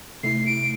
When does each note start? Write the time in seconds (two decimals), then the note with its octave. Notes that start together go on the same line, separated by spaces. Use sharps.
0.23 C3 A3 E4 C7
0.46 D7